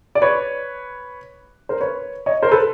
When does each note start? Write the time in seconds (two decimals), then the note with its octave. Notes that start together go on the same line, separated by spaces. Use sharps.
0.15 D5
0.22 B4 C#5
1.69 A#4 C5
1.80 B4 C#5
2.26 C#5 D#5
2.43 A#4 C5
2.51 A4 B4